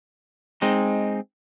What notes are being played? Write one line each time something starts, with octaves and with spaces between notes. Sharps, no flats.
G#3 C4 D#4